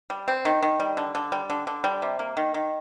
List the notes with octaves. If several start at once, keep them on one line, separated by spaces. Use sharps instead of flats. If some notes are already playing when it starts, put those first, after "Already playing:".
G3
C4
D#3
D#3
G3
D3
D3
G3
D3
D3
G3
C3
A#3
D#3
D#3